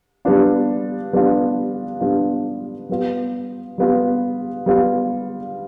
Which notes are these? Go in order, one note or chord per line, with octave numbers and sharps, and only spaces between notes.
G3 B3 D4 F4
G3 B3 D4 F4
G3 B3 D4 F4
G3 B3 F4
G3 B3 F4
G3 B3 F4